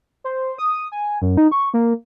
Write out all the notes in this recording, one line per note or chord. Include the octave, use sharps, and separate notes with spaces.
C5
D#6
G#5
F#2
D#4
C#6
A#3